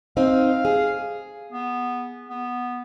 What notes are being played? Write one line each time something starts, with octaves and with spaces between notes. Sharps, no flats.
C4 D#4 F5
G#4
B3
B3